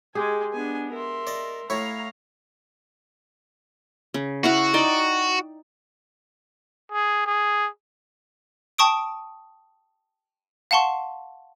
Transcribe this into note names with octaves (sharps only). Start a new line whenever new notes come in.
G#3 G4 G#4 G#5
B3 D4 G#5
A#4 E5 C6
D5 D#5
A2 E4 C#5 F5 A#5
C#3
E4 F#4 F5 F#5
D#4 D5 G5
G#4
G#4
G5 A5 C#6 D#6 D7
F5 F#5 A5 C6 C#6